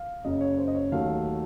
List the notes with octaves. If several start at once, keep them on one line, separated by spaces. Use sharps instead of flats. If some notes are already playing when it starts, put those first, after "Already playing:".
Already playing: F5
F#1 F#2 C#3 D#5
C#5
C5
D#5
C#5
D#2 D#3 F#3 A3 F5